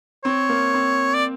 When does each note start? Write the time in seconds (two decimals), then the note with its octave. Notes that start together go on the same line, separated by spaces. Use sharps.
0.24 C4 C#5
0.49 A#3
0.74 C4
1.14 D5